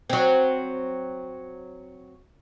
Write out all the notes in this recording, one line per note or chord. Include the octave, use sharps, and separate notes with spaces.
F#3 C4